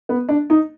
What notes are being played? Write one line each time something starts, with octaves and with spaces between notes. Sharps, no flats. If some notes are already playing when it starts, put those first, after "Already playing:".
B3
D4
D#4